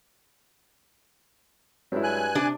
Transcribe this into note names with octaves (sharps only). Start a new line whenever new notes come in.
G2 F#3 G#3 E4
G#5 F#6
C3 D4